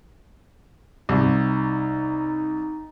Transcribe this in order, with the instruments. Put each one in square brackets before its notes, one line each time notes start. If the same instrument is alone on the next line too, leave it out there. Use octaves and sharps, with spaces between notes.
[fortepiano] C2 [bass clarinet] D#4